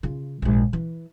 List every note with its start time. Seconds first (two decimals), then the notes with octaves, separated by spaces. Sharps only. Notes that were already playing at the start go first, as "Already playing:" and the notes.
0.03 C#3 F4
0.42 A#1 G#2
0.73 E3